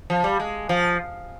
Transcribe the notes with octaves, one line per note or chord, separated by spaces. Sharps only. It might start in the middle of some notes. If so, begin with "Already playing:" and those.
F3
G3
G#3
F3